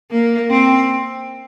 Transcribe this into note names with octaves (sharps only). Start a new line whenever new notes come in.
A#3
C4